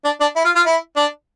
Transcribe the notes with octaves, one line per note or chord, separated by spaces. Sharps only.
D4
D4
E4
F4
F4
E4
D4